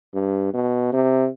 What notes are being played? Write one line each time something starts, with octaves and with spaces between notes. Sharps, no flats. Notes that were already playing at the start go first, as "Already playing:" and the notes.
G2
B2
C3